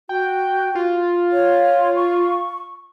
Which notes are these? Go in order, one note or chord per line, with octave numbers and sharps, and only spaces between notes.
F#4 G5
F4
C#5
C#6